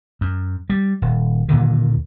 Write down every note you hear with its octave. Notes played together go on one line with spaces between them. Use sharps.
F#2
G3
D#1
D#2 A#2 D3 D#3